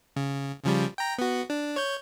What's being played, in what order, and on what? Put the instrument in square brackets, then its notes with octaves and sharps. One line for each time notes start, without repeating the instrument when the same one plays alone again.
[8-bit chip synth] C#3
C#3 F3 G3
G5 A#5
B3 F#4
D4
C#5 G6